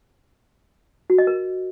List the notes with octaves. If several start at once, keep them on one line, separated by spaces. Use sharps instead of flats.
F#4
D#5
A#4